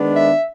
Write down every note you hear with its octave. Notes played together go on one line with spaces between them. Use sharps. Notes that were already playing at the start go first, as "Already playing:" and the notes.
Already playing: D#3 G#3 B3 D4
E5